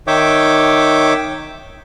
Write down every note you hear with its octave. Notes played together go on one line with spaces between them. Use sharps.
D#3 C#5 E5 G5 D6